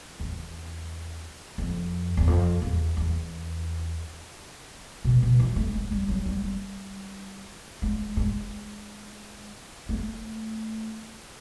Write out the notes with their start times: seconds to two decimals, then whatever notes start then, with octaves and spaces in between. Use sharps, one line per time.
0.20 E2
1.58 F2
2.17 E2
2.27 F2
2.62 E2
2.97 E2
5.05 B2
5.23 B2
5.40 E3
5.56 A3
5.74 G#3
5.92 G3
6.08 F#3
6.25 G3
6.44 G3
7.82 G#3
8.17 G#3
9.89 A3